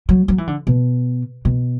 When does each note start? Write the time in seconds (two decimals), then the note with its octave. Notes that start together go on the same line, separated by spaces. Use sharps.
0.09 F#3
0.28 F#3
0.38 E3
0.47 D3
0.67 B2
1.45 B2